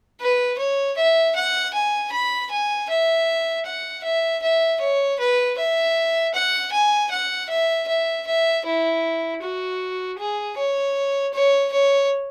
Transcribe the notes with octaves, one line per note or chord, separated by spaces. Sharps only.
B4
C#5
E5
F#5
G#5
B5
G#5
E5
F#5
E5
E5
C#5
B4
E5
F#5
G#5
F#5
E5
E5
E5
E4
F#4
G#4
C#5
C#5
C#5